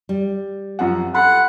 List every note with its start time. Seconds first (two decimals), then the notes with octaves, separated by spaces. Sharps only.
0.09 G3
0.79 F#2 F3 F#5
1.15 A4 F#5 B5 C6